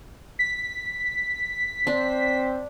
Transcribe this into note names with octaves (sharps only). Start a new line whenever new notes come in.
B6
C4 D4 C5